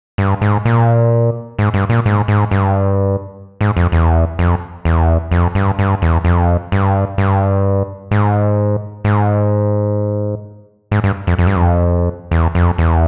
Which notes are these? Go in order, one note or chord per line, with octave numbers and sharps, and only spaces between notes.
G2
G#2
A#2
G#2
G2
A#2
G#2
G#2
G2
G#2
F2
E2
F2
E2
F2
G2
G2
E2
F2
G2
G2
G#2
G#2
G#2
G2
F2
F2
G2
F2
E2
F2
E2